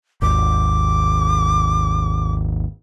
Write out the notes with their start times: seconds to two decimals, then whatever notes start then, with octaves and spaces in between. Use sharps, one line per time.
0.22 G#1 D#2 D6